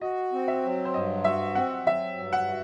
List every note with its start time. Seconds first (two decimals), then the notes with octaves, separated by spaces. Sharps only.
0.01 F#4 D#5
0.33 C4
0.48 E5
0.64 F#3
0.85 C5
0.94 G2 D#5
1.24 F#4 E5
1.55 C4 F#5
1.86 F#3 E5
2.18 G2
2.33 F#5
2.48 F#4